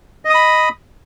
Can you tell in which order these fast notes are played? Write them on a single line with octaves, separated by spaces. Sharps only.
D#5 D#6 B5